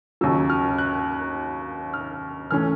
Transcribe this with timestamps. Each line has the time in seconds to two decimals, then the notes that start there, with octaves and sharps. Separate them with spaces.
0.21 D#2 C#3 F#3 E6
0.50 F6
0.78 F#6
1.94 F6
2.51 E3 A3 C#4 F6